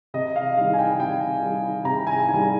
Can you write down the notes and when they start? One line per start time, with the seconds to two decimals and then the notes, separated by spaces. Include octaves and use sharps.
0.14 C3 D#5
0.36 F5
0.57 D#3 G3 F5
0.73 G#5
0.79 G5
0.99 C3 G5
1.42 D#3 G3
1.85 C3 A#5
2.07 G#5
2.29 D#3 G3 G#5